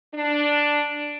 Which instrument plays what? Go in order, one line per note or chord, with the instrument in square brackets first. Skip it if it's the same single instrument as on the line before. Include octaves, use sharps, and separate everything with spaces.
[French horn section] D4